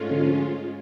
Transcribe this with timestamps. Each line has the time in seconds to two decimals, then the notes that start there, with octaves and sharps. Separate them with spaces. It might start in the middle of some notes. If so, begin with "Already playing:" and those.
Already playing: G#2 G#3 A3 C#4 F4
0.11 D3
0.23 F3